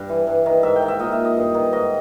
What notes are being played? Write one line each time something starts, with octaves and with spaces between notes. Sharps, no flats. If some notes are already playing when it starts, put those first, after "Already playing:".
Already playing: G2
E3
G2
D#3
G#2 E5
G5
D#3
E5
A#2 D#5
E5
D#5
G2
D#3
G#2 D#5